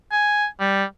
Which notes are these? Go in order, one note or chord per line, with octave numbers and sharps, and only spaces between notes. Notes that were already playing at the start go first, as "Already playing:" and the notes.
G#5
G3